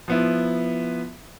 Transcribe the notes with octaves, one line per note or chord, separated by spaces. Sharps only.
F3 B3 E4